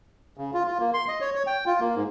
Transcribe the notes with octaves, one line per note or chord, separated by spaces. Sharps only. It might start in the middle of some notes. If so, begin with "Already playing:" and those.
C#3
F4
F4
A#3
C6
D#5
C#5
C#5
G5
F4
A#3
G#2